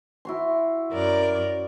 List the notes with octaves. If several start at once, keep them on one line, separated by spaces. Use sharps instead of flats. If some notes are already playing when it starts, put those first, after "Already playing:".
E4 F#4 C6
F#2 A#4 D5